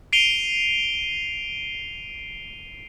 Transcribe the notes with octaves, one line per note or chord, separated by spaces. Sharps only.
C7 D7 D#7 F7 G7